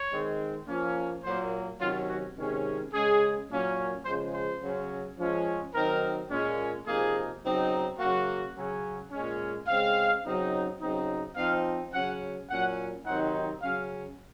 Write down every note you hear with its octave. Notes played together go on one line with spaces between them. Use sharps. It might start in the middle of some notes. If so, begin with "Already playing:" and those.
Already playing: C#5
D#3 G#3 C4
F3 A#3 C#4
A#2 F#3 A#3 C5
C3 D#3 F#3 C#4 F4
F#4
C3 D#3 G#3 C#4
C#3 G#3 C#4 G#4
A#2 F#3 A#3 C#4
C#3 F3 G#3 C5
C5
C#3 F#3 C#4
F3 G#3 C#4
D#3 F#3 C4 D#4 A#4
A#2 G#3 C#4
C3 F3 A#3 D#4 G#4
C#3 F#3 C4 D#4
C#3 F#3 A#3 F#4
C#3 F#3 C#4
A#2 G#3 C#4
C#3 G#3 C4 F5
C#3 F#3 C4 D#4
C#3 F#3 C4 D#4
F3 C4 D#4 F5
C#3 F#3 C#4 F#5
A#2 F#3 C#4 F#5
C3 D#3 F#3 C4 D#4 F#5
C#3 F#3 C#4 F5